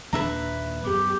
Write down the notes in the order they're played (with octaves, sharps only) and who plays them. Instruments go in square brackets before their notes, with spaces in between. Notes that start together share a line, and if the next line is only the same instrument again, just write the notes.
[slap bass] D#2 A#2 D4 [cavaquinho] B4 E5 A#5
[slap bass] F#2 B3 [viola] G4